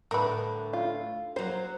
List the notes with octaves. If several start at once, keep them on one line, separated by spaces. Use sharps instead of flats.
A2 D3 A#4 B4
F4
F#3 A#3 C5